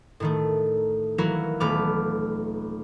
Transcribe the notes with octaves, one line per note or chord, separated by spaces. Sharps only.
A2 D#3 A3
E3 F#3 A#3 E4 F#4 A#4
D#1 A3 B3 B5 D6 F6